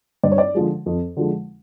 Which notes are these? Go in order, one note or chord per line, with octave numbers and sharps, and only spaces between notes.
G2 D5
C#5
D5
D3 F3 G#3
F2
D3 F3 G#3